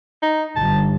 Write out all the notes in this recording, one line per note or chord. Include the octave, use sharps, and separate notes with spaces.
D#4
G1 A5